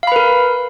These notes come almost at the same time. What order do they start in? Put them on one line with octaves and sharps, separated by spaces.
F5 B5 B4 A#4